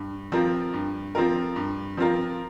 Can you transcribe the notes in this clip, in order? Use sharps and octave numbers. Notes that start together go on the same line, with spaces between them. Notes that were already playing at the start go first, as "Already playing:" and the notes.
Already playing: G2
F3 C4 F4 A#4
G2
F3 C4 F4 A#4
G2
F3 C4 F4 A#4